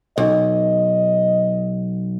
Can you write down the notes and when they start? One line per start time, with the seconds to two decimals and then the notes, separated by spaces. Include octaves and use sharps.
0.18 B1 D#5